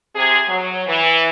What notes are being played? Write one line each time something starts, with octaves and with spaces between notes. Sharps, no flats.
C3 G#4
F#3
E3